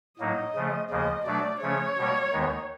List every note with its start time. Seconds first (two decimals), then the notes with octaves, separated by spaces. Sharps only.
0.19 A2 F#3 A#3 D#4 D#5
0.55 C#3 F3 A3
0.90 D#2 C#3 F3 A#3 D#5
1.25 B2 F#3 A3 D4 D5
1.61 C#3 F3 A3 C#4 C#5
1.98 B2 G3 A#3
2.32 D#2 D#3 G#3 B3 D#4